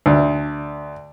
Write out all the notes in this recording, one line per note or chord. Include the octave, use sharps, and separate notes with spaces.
D2